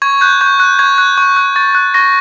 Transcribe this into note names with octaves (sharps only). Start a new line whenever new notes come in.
C#6 G#6
F#6 G6
C#6 G6
F#6
C#6 G#6
F#6
C#6
F#6
C#6 A6
F#6
C#6 A#6